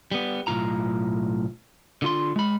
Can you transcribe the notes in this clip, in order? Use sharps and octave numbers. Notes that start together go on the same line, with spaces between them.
G3 B3
B1 A2 D#3 F4 A#5
D3 F4 C6
G#3 B5